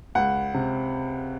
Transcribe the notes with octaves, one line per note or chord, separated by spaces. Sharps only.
C#2 F#5
C3